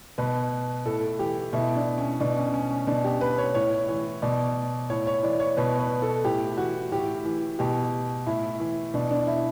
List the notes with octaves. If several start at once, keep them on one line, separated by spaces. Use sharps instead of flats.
B2 B4
A2 A4
E3 G4
B2 E4
D4
C#4
B2 D4
C#4
C#4
C#4
B2 D4
G4
B4
C#5
A2 C#5
E3
B2 D5
A2 C#5
C#5
E3 D5
C#5
B2 B4
B4
A4
A2 G4
E3 F#4
A2 G4
E3
B2 G4
A2 E4
E3
B2 D4
D4
E4